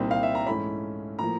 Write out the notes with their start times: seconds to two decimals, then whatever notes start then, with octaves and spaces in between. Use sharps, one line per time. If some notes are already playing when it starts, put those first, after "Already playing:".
Already playing: C2 A#2 G3 C4 D#4
0.11 F5
0.23 E5
0.35 A#5
0.46 G#2 E3 A3 C#4 B5
1.19 A2 F3 A#3 A#5